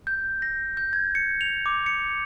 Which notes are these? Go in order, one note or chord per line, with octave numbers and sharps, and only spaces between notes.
G6
A#6
G6
G#6
C#7
F7
D6
C#7